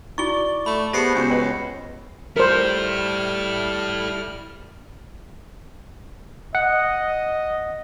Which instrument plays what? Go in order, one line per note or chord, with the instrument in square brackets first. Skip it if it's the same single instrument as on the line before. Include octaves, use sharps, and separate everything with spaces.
[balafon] D#4 E4 F#4 [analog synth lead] D5 [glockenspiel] C#6 G7
[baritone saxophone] A3 [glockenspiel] B5
[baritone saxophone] B3 [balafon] G4 G#4 A5 [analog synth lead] C5 [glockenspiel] A#6 C7 C#7
[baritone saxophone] C#2 [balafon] B3 F#4
[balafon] B4 D#5 G5 [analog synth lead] C#5
[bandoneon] G3 F6 [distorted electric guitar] E4 A4 [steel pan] A#4 C5
[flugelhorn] D#5 [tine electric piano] F#5